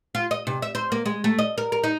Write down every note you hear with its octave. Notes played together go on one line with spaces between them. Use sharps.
F4
D#5
C3
E5
C5
A#3
G#3
A3
D#5
A#4
A#4
D#4